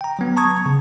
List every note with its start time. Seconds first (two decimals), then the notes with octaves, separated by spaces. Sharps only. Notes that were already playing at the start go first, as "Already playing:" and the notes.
0.01 G5 A#5
0.19 F#3 B3
0.37 A5 A#5 C#6 D#6 G#6
0.66 C#3